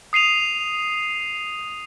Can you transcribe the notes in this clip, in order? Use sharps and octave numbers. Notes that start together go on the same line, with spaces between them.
D#6 C7 D#7 F7